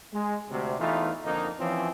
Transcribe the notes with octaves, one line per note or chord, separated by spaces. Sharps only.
G#3
D2 C3
E2 E3 A3 D#4 F4
F2 D3 A#3 D#4
E3 F3 C4 C#4